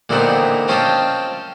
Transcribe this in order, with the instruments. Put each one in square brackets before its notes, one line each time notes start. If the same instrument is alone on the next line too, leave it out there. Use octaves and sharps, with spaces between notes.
[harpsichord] A#2 D3 E3 B3 C4 D#4
C4 C#4 F4 D#5 G5 A5